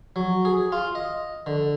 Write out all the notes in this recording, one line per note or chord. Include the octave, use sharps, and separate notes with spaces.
F#3
G#4
F4
D#5
D3